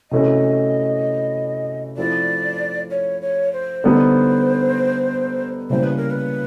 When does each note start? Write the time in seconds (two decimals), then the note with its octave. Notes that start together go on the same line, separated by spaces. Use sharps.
0.11 C3 E3 A3 C#4 F#4 D#5
1.97 F3 A3 C4 E4 D5
2.91 C#5
3.21 C#5
3.53 C5
3.84 D3 G3 B3 D#4
5.70 C#3 E3 G3 A#3 C5
5.83 B4
5.97 A#4
6.10 B4